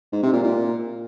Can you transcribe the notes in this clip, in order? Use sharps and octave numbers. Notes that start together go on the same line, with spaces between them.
G#2
C3
A#2
A#2